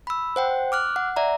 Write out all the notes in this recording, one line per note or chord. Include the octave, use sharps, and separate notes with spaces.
B5 E6
C5 F#5 G5
D6 F6 F#6
F#5
D5 E5 A#5